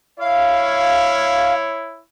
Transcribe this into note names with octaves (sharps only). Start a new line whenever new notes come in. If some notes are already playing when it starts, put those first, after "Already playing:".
E4 C#5 F5